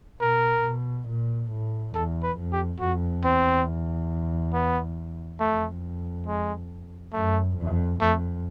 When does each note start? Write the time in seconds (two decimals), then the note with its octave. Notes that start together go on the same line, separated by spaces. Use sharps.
0.20 B2 A#4
0.65 B2
1.08 A#2
1.51 A2
1.94 E2 A4
2.23 B4
2.37 F2
2.52 G4
2.80 F2 F#4
3.23 E2 C4
4.53 B3
5.40 F2 A3
6.27 G#3
7.13 F#2 A3
7.57 F2
8.01 F2 A3